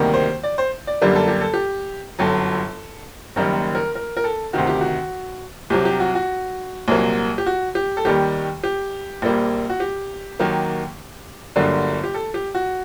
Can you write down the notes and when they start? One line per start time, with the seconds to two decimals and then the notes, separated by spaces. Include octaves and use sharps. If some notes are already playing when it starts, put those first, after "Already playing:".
Already playing: D2 C3 D#3 G3 A#3
0.13 C5
0.43 D5
0.58 C5
0.87 D5
1.02 F#2 D3 G3 A#3 G4
1.15 A4
1.28 G4
1.41 A4
1.54 G4
2.19 G1 F#2 F#3 A4
3.36 F#1 F#2 D#3 G3 A#3 A#4
3.75 A#4
3.95 A#4
4.17 A#4
4.24 A4
4.53 D2 C3 D#3 F#4
4.67 G4
4.81 F#4
5.70 C2 C3 F#3 G4
5.85 G4
6.00 F#4
6.15 F#4
6.88 C2 A#2 F#3 A#3
7.38 G4
7.46 F#4
7.75 G4
7.97 A4
8.05 D#2 D#3 G3 G4
8.63 G4
9.22 A#1 A#2 G3 A#3
9.70 F#4
9.80 G4
10.40 D#2 D#3 F#3 A#3
11.56 G1 G2 D3 F#3 A#3
12.03 G4
12.14 A4
12.34 G4
12.55 F#4